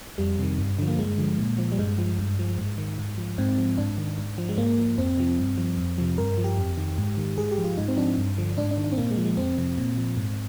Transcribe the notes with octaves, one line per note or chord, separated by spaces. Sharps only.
F2 G3
C3 D#3
G2
D3 F3
A#3
G2 G#3
D3 F3
A#2
F3
G3
G2 G#3
F3
G2
F3
G#2
D#3
G#2
F3
G#2 C4
F3
G#2 D4
D#3
G#2
F3
G#3
G#2 A#3
F3
F2 C4
C3 F3
G2
F3
F2
C3 F3
G2 A#4
F3
G4
F2
D#3
G#2
D#3
G#2 G#4
G4
F3
F4
G#2 D#4
C4
F3 D4
G2
D3 F3
G#2 D4
D4
D#3
D4
C4
A#2 A#3
G#3
F3
G#3
F2 C4
C3 F3
A#2
F3
G#2